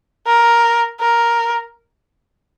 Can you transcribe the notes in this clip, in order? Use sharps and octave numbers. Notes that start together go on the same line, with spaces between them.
A#4
A#4